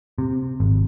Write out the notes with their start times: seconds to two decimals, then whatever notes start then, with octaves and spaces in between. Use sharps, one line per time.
0.18 C3
0.60 G#1